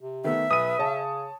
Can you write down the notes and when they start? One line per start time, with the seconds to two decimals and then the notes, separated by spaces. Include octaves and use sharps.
0.01 C3
0.24 D#3 A3 B3 E5
0.51 B1 B4 D#6 D#7
0.79 C#3 C#5 A5